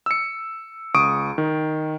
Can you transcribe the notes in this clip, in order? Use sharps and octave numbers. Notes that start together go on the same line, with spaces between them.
E6 C#7
C#2 C#6 D#6 D7
D#3